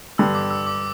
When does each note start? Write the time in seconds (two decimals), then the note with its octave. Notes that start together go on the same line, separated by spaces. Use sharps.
0.18 G2 D3 G3 E6
0.35 D6
0.51 E6
0.67 D6